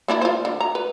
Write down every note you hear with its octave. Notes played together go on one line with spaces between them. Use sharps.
A#3 D4 E4
F4 C5
D3
A#5
B4